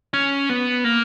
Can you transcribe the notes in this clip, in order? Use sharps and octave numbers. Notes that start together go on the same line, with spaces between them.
C#4
B3
A#3